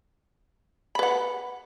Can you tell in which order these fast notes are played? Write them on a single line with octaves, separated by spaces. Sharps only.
B5 B4 F#5